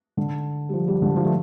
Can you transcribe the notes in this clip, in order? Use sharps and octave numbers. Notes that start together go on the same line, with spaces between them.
D3
G3
F3
G3
D3
F3
A3